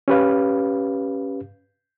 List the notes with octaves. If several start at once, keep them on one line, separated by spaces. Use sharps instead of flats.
C#4 G4 B4 F5